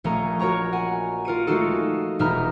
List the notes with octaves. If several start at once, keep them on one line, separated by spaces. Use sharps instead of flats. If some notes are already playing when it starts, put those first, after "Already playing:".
A#1 A3 C#4 D#5 A#5
F#4 A#4 C#5 A#5 C#6
F#5 G#5
F4 A#4 C#7 D#7
G#3 A3 D#4 F4 F#4 A4
E1 D#4 E4 A#5 F6